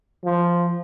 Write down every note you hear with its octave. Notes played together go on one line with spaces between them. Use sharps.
F3